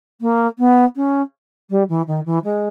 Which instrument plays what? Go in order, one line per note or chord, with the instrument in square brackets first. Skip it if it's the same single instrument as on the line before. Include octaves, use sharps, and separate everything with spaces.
[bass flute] A#3
B3
C#4
G3
E3
D#3
E3
G#3